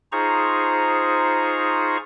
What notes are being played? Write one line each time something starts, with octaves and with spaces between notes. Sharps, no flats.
D#4 F4 G#4 C5 A#5 C#6